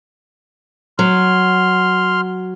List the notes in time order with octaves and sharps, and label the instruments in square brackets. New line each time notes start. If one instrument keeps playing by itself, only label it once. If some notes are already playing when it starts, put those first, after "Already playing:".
[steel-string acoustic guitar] F#3 [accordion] C6 F6